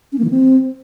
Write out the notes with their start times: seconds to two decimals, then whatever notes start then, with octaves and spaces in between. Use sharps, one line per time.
0.12 C#4
0.18 A#3
0.24 E3
0.30 C4